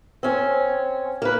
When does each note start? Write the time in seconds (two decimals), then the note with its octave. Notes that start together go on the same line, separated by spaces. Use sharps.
0.23 C4 C#4
1.22 A#3 B4